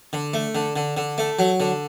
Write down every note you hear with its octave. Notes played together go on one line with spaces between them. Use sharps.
D3
A3
D3
D3
D3
A3
F#3
D3